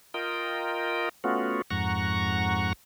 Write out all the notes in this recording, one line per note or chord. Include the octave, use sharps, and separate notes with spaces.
F4 A#4 D#5 G5
A3 B3 C#4 F4 F#4
F2 G#2 F#5 A#5 C#6